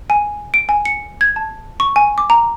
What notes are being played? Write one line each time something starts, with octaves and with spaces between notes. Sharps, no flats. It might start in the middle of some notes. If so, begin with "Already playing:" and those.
G#5
D7
G#5
C#7
G#6
A5
C#6
G#5
D6
A#5